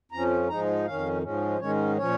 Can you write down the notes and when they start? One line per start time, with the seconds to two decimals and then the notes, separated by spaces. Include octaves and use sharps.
0.12 F2 F3 C#4 A#5
0.49 G#2 F3 G#3 D#4 A#5
0.86 F2 D#3 C#4 F5
1.23 G#2 F3 G#3 C#4
1.59 G#2 D#3 G#3 C#4 C#5
1.97 A#2 F3 C#4 C#5